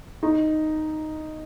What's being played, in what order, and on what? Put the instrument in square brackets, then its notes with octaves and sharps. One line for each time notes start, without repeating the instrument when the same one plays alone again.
[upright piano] D#4